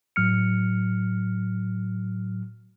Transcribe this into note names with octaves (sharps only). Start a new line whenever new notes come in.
A2 F#3 F6 C#7